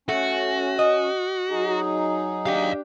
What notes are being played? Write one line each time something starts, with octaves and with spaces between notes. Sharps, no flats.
A3 C#4 F#4
D#5
F#3 D#4 G#4
D4 G4 D#5 F5